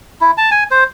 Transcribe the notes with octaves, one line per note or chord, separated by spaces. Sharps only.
E4
A5
G#5
C5